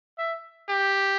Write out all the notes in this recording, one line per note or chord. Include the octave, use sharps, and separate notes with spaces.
E5
G4